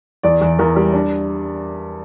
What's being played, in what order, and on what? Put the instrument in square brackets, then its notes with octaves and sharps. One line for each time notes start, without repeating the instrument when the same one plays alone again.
[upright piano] E2 D5
E2
E2 A#4
G3
D4